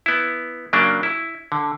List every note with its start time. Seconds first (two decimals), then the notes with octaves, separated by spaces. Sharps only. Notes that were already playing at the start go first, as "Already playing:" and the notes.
0.06 B3 E4
0.73 C#3 F#3 A#3 D4
1.03 E4
1.52 D3